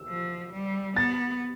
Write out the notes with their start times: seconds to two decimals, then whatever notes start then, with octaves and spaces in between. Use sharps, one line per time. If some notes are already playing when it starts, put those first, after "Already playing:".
Already playing: E6
0.09 F3
0.53 G3
0.96 B3 A6